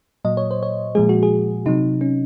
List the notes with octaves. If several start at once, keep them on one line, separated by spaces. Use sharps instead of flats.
A#2 F#3 D#5
C#5
C5
C#5
A#2 F3 G#3 G#4
F#4
G#4
C3 F#3 D#4
C#4